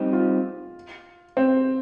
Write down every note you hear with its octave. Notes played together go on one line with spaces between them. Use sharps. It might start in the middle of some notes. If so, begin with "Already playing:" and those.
Already playing: G3 C4 D#4 G4
F4
C4